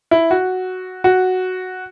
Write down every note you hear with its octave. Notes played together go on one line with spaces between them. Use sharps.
E4
F#4
F#4